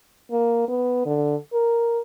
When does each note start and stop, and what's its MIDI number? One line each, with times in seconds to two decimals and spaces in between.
0.31 0.65 58
0.68 1.03 59
1.06 1.35 50
1.53 1.99 70